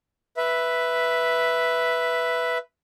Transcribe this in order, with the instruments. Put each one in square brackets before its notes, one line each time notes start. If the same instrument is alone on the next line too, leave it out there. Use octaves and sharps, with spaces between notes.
[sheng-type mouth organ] B4 E5